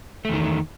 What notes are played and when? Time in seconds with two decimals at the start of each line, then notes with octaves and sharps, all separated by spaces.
0.25 A3
0.29 E2
0.34 D#3